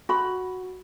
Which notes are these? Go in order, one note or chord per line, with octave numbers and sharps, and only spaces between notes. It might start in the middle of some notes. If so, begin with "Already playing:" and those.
F#4 B5